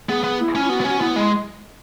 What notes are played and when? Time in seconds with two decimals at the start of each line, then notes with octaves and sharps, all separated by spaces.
0.09 B3 G#4
0.24 B3
0.40 E4
0.55 C#4
0.65 E4
0.69 B3 F#4
0.80 B3
0.84 C#4 F#4
1.00 B3 E4
1.16 G#3